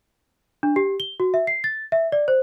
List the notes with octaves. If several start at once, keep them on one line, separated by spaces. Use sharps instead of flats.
D4
G4
G7
F#4
E5
C7
A6
E5
D5
C5